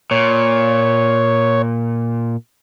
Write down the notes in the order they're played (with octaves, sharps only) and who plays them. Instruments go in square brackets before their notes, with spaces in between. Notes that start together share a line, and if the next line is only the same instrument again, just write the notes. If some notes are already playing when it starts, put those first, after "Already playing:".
[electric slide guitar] A#2 [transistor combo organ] C#5